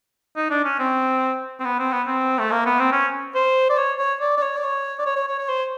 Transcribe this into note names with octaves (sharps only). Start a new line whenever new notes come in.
D#4
D4
C#4
C4
C4
B3
C4
B3
C4
A3
A#3
B3
C4
C#4
C5
D5
C#5
C#5
D5
D5
C#5
D5
C#5
D5
C#5
C#5
C#5
C#5
C5